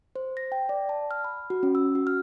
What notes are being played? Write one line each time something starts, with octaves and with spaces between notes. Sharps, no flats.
C5
A#6
G5
D5
A5
F6
B5
F#4
C#4
E6
F#4
F6